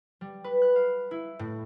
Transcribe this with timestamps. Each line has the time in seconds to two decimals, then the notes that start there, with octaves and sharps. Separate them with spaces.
0.21 G3
0.44 B4
0.62 F#6
0.76 F5
1.11 E4
1.39 A2